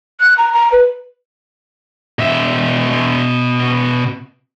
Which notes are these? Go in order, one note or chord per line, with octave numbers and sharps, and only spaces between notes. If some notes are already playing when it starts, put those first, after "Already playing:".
F#6
A#5
A#5
B4
B2 E5